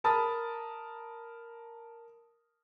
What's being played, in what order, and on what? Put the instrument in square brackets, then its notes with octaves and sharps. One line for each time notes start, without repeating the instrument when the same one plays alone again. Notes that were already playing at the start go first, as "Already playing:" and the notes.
[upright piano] A#4 A5 B5 D#6 A6